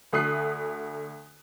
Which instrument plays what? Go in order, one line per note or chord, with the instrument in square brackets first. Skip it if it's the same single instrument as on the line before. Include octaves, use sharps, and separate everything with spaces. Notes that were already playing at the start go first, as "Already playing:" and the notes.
[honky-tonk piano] D2 A3 D#6 F#6 C7